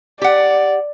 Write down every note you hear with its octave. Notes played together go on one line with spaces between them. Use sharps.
G4 D5 F#5